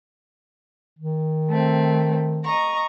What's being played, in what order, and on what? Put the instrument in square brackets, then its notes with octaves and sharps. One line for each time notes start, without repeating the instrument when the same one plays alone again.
[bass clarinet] D#3
[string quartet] A3 C4
D#5 A#5 C#6